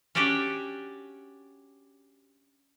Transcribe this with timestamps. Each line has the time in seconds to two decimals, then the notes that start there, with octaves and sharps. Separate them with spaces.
0.15 C#4 D4 F#4 G4 G5